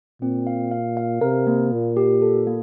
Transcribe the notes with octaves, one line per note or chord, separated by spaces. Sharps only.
A#2 C4
F5
F5
F5
C3 A#4
A#3
A#2 A#4
G4
A4
A#3